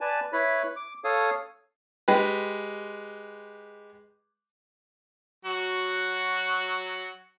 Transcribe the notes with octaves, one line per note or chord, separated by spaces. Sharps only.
B4 D5 G#5 A5
E4 B4 C#5 B5
D6
A4 C#5 F5 D#6
G#3 G4 B4
F#3 F#4